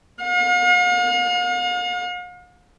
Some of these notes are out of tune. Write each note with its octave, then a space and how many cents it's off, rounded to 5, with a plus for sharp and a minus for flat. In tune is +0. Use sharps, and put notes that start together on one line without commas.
F5 +45